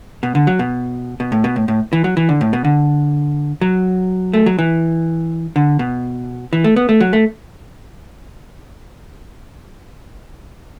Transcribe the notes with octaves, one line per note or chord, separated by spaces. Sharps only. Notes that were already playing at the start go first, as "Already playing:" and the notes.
B2
D3
F#3
B2
B2
A2
B2
A2
A2
E3
F#3
E3
D3
A2
B2
D3
F#3
A3
F#3
E3
D3
B2
E3
A3
B3
A3
F#3
A3